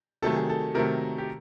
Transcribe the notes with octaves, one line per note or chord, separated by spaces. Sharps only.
C3 D#3 F#3 A3 A4
G#4
A4
C3 D#3 F#3 A3 A#4
G4